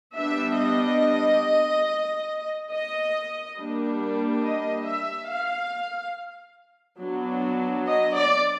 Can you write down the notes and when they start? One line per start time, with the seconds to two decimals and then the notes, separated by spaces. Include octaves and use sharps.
0.15 G3 B3 D4 E5
0.58 D#5
2.72 D#5
3.57 G3 A#3 D4
4.43 D#5
4.86 E5
5.28 F5
7.00 F#3 B3 D4
7.86 D#5
8.13 D5